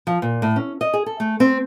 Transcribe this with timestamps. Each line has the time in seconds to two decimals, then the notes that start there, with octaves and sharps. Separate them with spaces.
0.07 F3
0.22 A#2
0.42 A2
0.56 C#4
0.81 D#5
0.93 G#4
1.06 A4
1.20 A3
1.40 C4